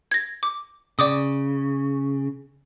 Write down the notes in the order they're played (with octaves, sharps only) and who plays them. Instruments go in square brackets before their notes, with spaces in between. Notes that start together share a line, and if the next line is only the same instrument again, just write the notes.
[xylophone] G#6 A#6
D6
[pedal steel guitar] C#3 [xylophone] D5 D6 D#6